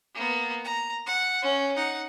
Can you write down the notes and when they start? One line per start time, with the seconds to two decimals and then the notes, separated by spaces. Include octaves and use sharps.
0.15 A#3 B3
0.64 A#5
1.06 F#5
1.42 C#4
1.76 D#4 F#5